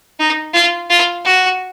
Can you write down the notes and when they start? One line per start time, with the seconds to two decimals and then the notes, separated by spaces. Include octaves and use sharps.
0.19 D#4
0.54 F4
0.90 F4
1.25 F#4